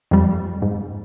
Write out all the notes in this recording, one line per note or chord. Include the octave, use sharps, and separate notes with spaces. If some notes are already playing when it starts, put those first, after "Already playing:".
F2 G3
G#2